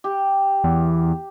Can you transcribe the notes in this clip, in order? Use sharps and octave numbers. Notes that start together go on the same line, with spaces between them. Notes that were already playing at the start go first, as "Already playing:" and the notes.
G4
E2